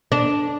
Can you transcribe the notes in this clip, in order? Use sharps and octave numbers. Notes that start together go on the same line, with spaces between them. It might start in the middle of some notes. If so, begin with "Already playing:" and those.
D4